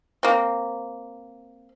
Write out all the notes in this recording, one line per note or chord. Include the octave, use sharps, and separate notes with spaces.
A#3 C4